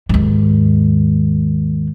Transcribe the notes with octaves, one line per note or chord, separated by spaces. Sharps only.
D#2 G#2